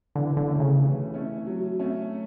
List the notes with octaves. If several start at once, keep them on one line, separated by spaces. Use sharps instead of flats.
D3 E3
D3
A3 C#4
C#3
E3
A3 C#4
F#3
A3 C#4